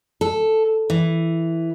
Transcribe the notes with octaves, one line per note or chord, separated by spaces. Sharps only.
A4
E3